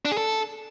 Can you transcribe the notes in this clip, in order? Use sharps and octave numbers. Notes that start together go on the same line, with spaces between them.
D4
G#4
A4